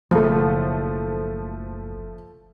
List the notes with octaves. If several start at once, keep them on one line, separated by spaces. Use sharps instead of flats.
F#1 B1 F3 A3